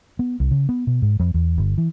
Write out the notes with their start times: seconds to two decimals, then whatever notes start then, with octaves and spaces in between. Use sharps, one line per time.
0.19 B3
0.40 C2
0.51 C#3
0.69 B3
0.87 B2
1.02 G#2
1.20 F2
1.34 E2
1.58 G1
1.78 E3